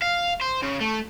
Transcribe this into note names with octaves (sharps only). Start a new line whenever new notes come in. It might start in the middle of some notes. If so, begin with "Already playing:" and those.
F5
C5
C#3
A3